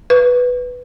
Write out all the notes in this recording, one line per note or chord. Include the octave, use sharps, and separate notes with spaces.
B4